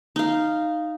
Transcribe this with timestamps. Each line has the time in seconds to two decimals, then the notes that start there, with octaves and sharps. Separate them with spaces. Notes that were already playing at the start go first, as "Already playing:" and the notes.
0.16 D#4 F5